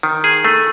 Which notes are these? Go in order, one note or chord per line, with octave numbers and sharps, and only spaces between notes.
D#3
G#4
A3